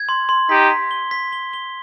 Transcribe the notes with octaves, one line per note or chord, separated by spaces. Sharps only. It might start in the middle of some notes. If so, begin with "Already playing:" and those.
Already playing: G#6
C6
C6
D#4 G4 B6
B6
G7
B6
G7
G7